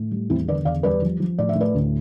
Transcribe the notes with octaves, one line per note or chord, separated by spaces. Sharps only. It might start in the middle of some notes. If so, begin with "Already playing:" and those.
Already playing: A2
G3
E2 C4 E4
D3 B4 D5
E2 D5 F5
G3 B4 D5
F3
F3
A2 D5
E5
A2
B4 D5
D2